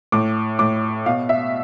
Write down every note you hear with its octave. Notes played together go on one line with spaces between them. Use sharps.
A2 D6
A2 D6
B2 F5
E5